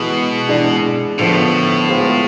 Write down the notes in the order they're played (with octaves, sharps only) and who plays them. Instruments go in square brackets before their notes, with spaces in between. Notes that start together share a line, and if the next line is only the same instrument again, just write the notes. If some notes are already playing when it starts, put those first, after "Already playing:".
Already playing: [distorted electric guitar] B2 [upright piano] E3 G#3 B3
[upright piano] E3 G#3 D4
[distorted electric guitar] A2 [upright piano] D3 F3 B3
[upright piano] G#3 B3 F4 G#4 C5